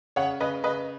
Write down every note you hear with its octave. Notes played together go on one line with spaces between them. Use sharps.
C#3 C#5 F#5
C#3 B4 D#5
C#3 B4 D#5